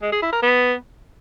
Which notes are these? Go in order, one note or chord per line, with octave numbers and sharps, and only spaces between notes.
G#3
G#4
E4
A#4
B3